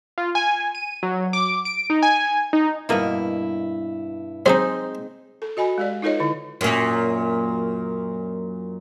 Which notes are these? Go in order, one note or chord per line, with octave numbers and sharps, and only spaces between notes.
F4
G#5
D#7
F#3
D6
D7
D#4
G#5
D#4
G2 B2 A#3 E4 D#5
F#3 G#3 C4 D#4 C5
A4
F#4 D#5 G#5 B5
G#3 G4 D5
D#4 F4 A4 B4 C#5 D#5
D3 E4
F#2 A#2